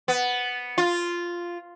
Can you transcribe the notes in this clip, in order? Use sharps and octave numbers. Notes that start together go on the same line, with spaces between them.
B3
F4